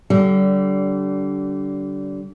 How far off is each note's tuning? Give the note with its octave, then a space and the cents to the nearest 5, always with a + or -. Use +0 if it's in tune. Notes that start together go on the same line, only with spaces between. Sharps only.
D3 -25 G3 -35